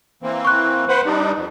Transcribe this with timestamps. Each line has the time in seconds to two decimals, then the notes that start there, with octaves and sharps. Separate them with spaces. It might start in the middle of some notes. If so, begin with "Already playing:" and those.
0.23 E3 A#3 C4
0.45 C#6 F#6
0.89 B4 C5 F#5
1.05 G3 D4 D#4
1.36 F2